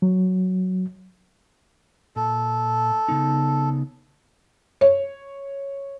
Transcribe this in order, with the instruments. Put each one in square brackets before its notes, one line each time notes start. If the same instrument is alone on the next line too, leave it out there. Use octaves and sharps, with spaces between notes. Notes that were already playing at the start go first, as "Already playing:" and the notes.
[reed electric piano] F#3
[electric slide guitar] A#2 [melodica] A4
[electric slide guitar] C#3 B3 D#4
[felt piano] C#5